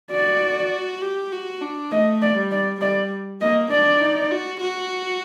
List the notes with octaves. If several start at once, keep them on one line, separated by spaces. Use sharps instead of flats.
F#4 D5
G4
F#4
D4
A3 D#5
D5
G3
D5
G3 D5
A#3 D#5
D4 D5
D#4
F#4
F#4